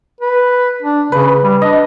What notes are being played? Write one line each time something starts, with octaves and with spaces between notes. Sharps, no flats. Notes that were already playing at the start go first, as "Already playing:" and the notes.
B4
D4
C#3 B4
G3
D4 D#5